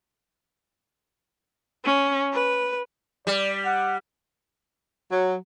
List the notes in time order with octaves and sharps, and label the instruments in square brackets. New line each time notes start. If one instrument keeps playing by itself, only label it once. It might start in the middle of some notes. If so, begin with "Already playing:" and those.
[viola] C#4
B4
[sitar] G3 [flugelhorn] D5
[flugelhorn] F#5
[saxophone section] F#3